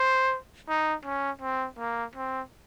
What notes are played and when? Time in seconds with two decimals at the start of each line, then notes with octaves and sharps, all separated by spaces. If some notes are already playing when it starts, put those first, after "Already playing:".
Already playing: C5
0.68 D#4
1.05 C#4
1.41 C4
1.79 A#3
2.15 C4